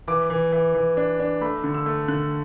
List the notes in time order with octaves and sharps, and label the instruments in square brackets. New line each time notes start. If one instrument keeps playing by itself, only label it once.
[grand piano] E3 D6
E3
E3
E3
D4
D4
A3 B5
D3
E6
A3
D3 F#6